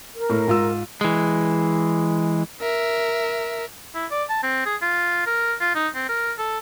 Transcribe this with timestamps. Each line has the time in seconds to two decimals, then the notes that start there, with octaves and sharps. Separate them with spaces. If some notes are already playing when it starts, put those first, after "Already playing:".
0.17 A#4
0.29 A2
0.47 G#2 F4 E6
1.01 E3 G#3
2.61 A#4 E5
3.95 E4
4.11 D5
4.29 A5
4.43 C4
4.66 G#4
4.82 F4
5.27 A#4
5.61 F4
5.75 D#4
5.95 C4
6.09 A#4
6.38 A4